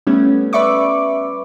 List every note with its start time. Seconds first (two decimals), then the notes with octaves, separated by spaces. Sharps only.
0.07 G3 A3 B3 C#4
0.53 B4 D5 E5 C#6 D6